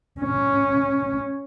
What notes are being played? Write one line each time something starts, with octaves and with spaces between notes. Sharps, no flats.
C#4